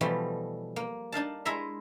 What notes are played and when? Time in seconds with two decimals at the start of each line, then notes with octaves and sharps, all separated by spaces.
0.01 B2 E3 F3 G3 A3
0.76 A#3
1.12 D4 D#4 F5 A5
1.45 G#3 E4 G#4 E5 A#5 C6